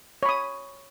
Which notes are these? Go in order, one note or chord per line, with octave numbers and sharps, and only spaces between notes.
C#5 B5 D#6